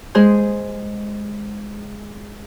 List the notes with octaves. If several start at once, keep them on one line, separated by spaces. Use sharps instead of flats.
G#3 G#4 C5